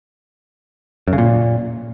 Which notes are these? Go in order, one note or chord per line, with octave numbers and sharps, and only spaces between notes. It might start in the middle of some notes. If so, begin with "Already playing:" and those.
F#2
C#3
A#2